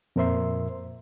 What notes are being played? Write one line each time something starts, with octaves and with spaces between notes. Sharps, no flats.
F2 A#2 A#4 C5 E5 C6